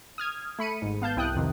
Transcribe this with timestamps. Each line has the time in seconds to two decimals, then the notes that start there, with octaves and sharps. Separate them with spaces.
0.18 D#6 F6 G#6
0.59 A3 B5 C#7 D#7
0.82 G#1 G#2
1.02 B3 F5 A5 G6
1.16 C2 E4 G5 D#6 F#6
1.35 F2 C3 D#3